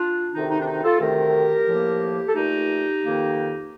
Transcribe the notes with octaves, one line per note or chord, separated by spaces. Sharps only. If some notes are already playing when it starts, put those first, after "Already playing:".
Already playing: D4 F4
D2 C3 D#3 D#4
D#4
D4
D#4
F4 A4
D2 C3 D#3 A3 G4 A#4
A2 F3 A#3
A4
A#2 A3 D#4 G4
F2 D#3 A#3